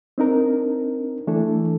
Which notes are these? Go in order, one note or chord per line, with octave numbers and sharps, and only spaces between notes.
C4 D4 D#4 A#4
E3 A3 D4 E4 A4